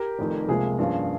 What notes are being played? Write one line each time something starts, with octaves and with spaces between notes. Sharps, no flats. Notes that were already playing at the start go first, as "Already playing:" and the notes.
Already playing: G4 A#4
F1 F2 D#3
C#2 C3 F3 A#3 G#4
G2 F3 A#3 C#4 F4